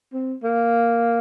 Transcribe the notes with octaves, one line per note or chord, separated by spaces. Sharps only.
C4
A#3